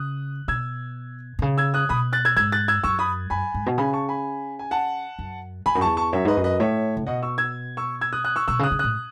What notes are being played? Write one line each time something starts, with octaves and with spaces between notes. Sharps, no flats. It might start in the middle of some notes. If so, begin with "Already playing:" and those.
Already playing: C#3 D#6 F#6
B2 E6 G#6
B2
C#3
E6 G#6
D#6 F#6
B2 B5 D#6
F#6 A6
E6 G#6
G#2 E6 G#6
F#6 A6
E6 G#6
F#2 C#6 E6
B5 D#6
F#2 G#5 B5
G#2
B2
C#3 G#5 B5
A5 C#6
G#5 B5
G#5
F#5 A5
F#2
E2 G#5 B5
F#2
E2 A5 C#6
A5 C#6
F#2 C#5 E5
G#2 B4 D#5
F#2
B4 D#5
A2 C#5 E5
C#3
B2 D#5 F#5
C#6 E6
E6 G#6
C#6 E6
E6 G#6
D#6 F#6
D#6 F#6
C#6 E6
B2 C#6 E6
C#3
D#6 F#6
C#3
A2 D#6 F#6